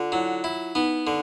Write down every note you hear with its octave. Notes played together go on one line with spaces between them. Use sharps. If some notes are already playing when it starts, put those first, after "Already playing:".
Already playing: D3 F4
F#3 E4
E4
B3 D#4
D3